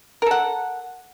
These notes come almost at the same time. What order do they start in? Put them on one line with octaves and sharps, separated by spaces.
A#4 A4 F#5